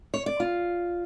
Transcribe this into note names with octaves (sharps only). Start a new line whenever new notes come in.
C#5
D5
F4